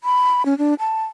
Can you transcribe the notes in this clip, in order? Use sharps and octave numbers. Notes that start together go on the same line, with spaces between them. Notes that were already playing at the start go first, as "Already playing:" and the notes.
B5
C#4
D4
A5